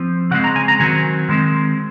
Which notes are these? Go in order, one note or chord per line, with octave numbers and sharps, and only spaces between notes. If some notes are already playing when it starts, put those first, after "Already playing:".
Already playing: F3 C4
C#3 G#3 C4 F#5
A#5
G#5
A#5
D#3 F#3 C4 G#5
D#3 G#3 C4